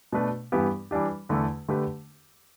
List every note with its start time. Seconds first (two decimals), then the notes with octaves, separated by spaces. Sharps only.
0.12 B2 A3 D4 B4
0.52 G2 E3 B3 G4
0.91 E3 G3 D4 G4
1.29 E2 D3 A3 E4
1.68 D3 A3 G4 B4